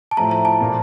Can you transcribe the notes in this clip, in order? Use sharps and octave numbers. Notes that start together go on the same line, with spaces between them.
A5
A2 F3 A3 A#5
A#5
A5
A#2 F3 A#3 F4